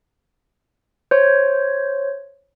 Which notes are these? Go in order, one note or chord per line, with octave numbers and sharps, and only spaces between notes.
C5 C#5